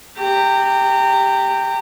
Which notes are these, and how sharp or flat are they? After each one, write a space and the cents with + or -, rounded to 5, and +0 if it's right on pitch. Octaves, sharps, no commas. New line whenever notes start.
G4 +0 A#5 -30